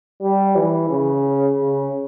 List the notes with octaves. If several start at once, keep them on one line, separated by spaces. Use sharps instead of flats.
G3
E3
C#3
C#3